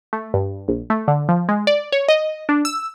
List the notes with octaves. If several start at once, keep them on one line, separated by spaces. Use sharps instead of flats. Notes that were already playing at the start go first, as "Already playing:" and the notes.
A3
G2
A#1
A3
D3
F3
G#3
D5
C#5
D#5
D4
E6